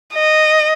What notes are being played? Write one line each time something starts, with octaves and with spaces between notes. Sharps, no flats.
D#5